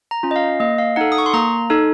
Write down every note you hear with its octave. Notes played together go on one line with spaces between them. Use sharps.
A#5
C#4 F4
D#5
F5
A#3 D#5
F5
D#4 A4 F#5
D#6
C#6
C6
A#3 A#5
D#4 A4